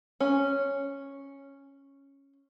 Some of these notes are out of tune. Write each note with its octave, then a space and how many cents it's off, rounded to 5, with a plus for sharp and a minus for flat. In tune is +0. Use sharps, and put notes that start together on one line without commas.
C#4 -5